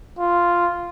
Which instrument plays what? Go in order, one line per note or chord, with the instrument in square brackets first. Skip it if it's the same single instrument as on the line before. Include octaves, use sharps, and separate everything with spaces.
[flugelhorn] F4